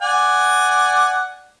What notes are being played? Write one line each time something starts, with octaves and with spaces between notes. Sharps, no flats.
D5 F#5 G#5